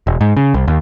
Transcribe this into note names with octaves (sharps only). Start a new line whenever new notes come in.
E1
G#2
C#3
C2
D#2